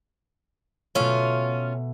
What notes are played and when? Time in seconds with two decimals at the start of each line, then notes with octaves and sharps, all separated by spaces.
0.95 B2 A3 C#4 F4